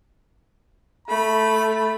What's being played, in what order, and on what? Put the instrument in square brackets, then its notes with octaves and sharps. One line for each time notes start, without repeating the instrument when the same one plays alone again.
[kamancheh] A3 [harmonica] B5